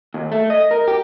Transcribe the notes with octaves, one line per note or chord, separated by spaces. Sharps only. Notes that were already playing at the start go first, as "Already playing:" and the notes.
D#2
A3
D#5
A#4
G4